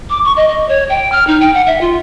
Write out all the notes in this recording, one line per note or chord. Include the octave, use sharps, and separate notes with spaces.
D6
C#6
D#5
D#5
C#5
G5
F6
D#4
G5
F#5
E5
F4